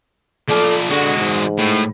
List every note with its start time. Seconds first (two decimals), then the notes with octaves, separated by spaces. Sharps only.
0.48 F3 A4 D5
0.89 D3 G#3 F#4
1.20 G#2
1.58 A2